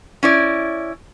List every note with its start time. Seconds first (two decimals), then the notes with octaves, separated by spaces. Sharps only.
0.23 C#4 E4 D5